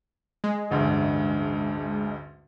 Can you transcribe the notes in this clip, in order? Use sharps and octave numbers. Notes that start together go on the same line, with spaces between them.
G#3
A1 D2 G2